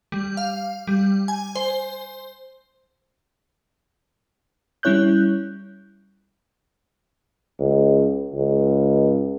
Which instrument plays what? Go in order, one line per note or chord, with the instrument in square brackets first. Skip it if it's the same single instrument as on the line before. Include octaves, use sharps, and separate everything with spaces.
[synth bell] G3
F5
G3
G#5
C5
[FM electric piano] G3 C#4 E4 C#5 F#6 G6
[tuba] C#2
C#2